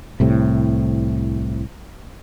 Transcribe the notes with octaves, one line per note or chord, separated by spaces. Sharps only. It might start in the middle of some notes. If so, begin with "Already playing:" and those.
C2 A2 C3